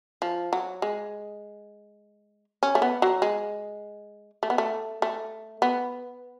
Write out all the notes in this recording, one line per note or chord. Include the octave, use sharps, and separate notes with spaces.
F3
F#3
G#3
C#4
A3
B3
F#3
G#3
A3
B3
A3
A3
B3